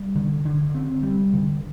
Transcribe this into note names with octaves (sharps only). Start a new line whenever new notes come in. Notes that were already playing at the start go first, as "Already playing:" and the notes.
Already playing: G3
D3
D3
C4
G3
D3